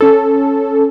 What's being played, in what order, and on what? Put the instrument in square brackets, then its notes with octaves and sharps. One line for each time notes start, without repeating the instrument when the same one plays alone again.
[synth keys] C#4 A4